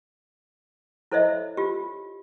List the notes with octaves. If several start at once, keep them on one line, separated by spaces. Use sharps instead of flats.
E4 A4 C5 C#5 D#5 E5
F4 G4